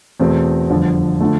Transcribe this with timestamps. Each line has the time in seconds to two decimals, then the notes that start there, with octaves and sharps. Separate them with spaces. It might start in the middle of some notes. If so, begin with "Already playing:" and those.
0.20 E2 B2 A3 C4
0.70 G1 F2 D3 F3
1.21 D3 F3 A3